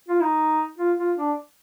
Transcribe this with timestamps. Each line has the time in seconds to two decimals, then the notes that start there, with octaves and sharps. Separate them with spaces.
0.09 F4
0.21 D#4
0.78 F4
0.99 F4
1.18 D4